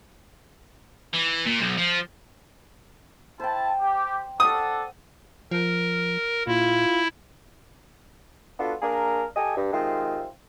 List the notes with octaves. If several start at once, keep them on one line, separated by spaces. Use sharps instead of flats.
E3
A#2
B1
F3
E4 C5 G5 A5
G4
D4 A4 F#5 D#6
F3 A#4
A#2 E4 F4
B3 D4 F4 F#4 A4
A#3 D4 G#4 A#4
G4 A4 D#5 G#5
G2
C3 D#3 G#3 C4 F4